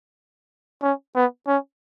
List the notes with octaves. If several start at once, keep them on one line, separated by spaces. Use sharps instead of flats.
C#4
B3
C#4